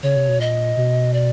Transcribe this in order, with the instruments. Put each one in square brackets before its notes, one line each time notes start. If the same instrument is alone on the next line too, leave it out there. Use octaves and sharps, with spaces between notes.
[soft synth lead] C#3 [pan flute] C#5
[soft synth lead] C3
B2
[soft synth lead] A#2 [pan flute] D#5
[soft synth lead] B2
[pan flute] D5